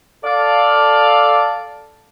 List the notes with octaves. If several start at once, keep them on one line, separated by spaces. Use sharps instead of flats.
A4 D5 F5